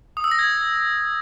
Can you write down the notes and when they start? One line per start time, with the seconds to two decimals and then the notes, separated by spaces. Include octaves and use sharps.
0.17 D#6
0.24 E6
0.31 A#6
0.39 G#6